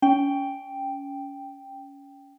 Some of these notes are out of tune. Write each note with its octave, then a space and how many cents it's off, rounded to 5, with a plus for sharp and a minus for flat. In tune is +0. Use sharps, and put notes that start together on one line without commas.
C#4 +20 G5 +0